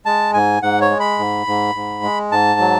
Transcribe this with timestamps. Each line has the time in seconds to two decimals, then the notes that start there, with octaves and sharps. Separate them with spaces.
0.06 G#3 A5
0.34 G#2 G#5
0.62 G#2 F#5
0.81 C#5
0.90 G#3
1.00 B5
1.18 G#2
1.47 G#2
1.75 G#2
2.03 G#3
2.32 G#2 A5
2.60 F#3